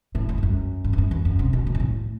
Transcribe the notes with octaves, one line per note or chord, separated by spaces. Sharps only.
A2
E2
G2
F#2
G2
E2
F#2
E2
F#2
C3
B2
A2
G2
A2